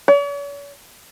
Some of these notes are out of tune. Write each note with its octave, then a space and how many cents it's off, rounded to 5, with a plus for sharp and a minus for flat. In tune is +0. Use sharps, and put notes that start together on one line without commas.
C#5 +45